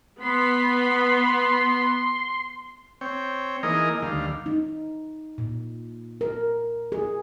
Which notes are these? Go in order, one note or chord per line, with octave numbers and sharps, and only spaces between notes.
B3 B5 C6
C4 C#5 G5
E3 A#3 D#4 G#4 A#4 D#5
D2 D#3 G3 F5
D#4
A#2
A#4
G#4